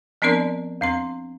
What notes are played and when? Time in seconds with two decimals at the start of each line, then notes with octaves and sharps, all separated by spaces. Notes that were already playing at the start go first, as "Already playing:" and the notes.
0.22 F3 B3 C4 D4 A#4 D5
0.81 E2 C4 C6